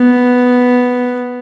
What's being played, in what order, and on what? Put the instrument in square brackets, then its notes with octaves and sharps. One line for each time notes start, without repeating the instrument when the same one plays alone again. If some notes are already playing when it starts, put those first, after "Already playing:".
Already playing: [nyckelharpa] B3